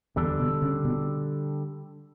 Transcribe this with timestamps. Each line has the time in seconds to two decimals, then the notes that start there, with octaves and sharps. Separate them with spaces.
0.16 E2 D3 G3 D4 A4
0.40 B2
0.62 C#3
0.85 B2